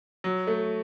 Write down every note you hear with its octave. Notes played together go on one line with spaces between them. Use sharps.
F#3
A3